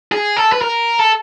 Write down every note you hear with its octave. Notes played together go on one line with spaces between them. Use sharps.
G#4
A4
B4
A#4
A4